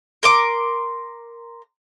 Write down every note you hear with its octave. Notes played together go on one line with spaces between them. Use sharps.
A#4 C6 D6